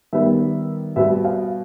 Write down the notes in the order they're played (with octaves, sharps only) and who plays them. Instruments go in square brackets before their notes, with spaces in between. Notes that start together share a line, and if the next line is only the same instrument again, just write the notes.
[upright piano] D#3 G3 B3 E5
B2 G3 B3 E5
F5